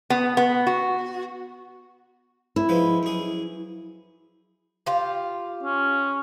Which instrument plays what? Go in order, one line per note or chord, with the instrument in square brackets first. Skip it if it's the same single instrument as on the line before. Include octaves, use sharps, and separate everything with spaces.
[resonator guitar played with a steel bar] B3
B3
F#4
[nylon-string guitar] E4
[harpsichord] F3 G#3 B4
F#2 G#4
[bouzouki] F4 G4
[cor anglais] C#4